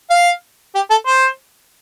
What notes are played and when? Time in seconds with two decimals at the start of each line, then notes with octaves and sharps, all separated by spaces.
0.11 F5
0.75 G4
0.90 A4
1.07 C5